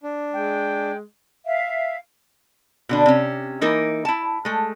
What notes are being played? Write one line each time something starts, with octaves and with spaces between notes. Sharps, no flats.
D4
G#3 G5
E5 F5
B2 D3 D4
C3 C#4
E3 A#3 D#4 A#4
E4 A5
G#3 A3